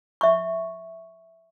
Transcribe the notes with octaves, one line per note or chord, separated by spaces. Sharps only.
E5 C#6